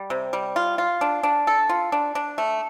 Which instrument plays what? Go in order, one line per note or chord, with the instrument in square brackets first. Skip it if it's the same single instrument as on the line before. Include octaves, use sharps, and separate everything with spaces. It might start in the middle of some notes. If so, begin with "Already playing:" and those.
Already playing: [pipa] G3
C3
G3
F4
F4
D4
D4
A4
F4
D4
D4
A3